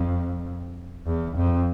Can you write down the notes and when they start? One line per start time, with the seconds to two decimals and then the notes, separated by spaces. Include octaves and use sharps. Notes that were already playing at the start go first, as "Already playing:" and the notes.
Already playing: F2
1.06 E2
1.37 F2